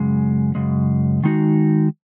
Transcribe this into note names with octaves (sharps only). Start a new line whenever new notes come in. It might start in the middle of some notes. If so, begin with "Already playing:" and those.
Already playing: F#2 C#3 G#3
F#2 C#3 G#3
D#3 G#3 D#4 F#4